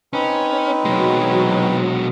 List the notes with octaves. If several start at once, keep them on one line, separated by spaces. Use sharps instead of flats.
C4 C#4 D#4 B4
B2 F#3 G#3